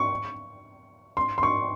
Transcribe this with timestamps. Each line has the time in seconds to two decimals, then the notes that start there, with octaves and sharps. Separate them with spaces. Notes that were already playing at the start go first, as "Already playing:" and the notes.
Already playing: C#6
1.17 C6
1.38 C6
1.43 C#6